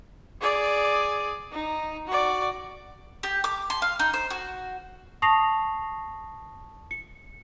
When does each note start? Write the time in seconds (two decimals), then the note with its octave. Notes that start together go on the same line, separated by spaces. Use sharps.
0.41 G#4 D5
1.52 D#4
2.07 F#4 D5
3.23 G4
3.44 D6
3.70 C6
3.82 F5
3.99 D#4
4.14 C5
4.30 F#4
5.22 A5 C#6 D#6 A#6 C7 F7
6.91 C#7